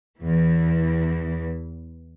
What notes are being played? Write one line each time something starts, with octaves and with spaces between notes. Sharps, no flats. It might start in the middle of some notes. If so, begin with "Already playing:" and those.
E2 E3